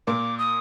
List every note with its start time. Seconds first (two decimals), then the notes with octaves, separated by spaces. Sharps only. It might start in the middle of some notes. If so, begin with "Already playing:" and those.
0.07 A#2 A#3 D6
0.39 D#6